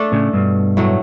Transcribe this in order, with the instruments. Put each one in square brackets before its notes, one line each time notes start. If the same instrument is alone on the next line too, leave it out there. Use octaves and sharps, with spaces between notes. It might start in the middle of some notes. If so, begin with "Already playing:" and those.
Already playing: [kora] A3 D4 A4
[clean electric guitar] A2 C#3
G2 B2
[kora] A2 F#3 A3